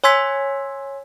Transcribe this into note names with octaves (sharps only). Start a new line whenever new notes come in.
C#5 G#5 C6 E6 G#6 B6